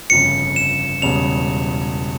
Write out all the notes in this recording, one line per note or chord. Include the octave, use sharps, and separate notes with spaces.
G1 F2 C#3 C#7
E7
E1 E2 C#3 G3 F7